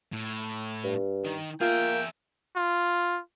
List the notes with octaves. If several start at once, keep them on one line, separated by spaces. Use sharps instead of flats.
A2
G2
D#3
A#3 F4 G#4 E5 G5
F4